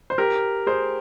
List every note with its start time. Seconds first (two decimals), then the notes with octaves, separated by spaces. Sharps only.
0.10 C5
0.18 G4 A#4
0.67 G#4 C5